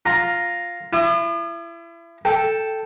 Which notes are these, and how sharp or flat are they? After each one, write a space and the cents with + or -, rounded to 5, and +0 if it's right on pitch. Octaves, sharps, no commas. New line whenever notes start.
F4 +0 A#5 +0
E4 +35 D#6 -45
A4 +0 G5 +0